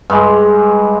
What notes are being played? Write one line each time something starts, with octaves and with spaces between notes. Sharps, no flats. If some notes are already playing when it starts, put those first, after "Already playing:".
G2 G#3